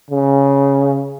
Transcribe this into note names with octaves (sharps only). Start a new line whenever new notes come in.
C#3